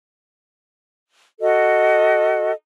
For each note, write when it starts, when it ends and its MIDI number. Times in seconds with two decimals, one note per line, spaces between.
1.40 2.52 66
1.40 2.52 69
1.40 2.52 75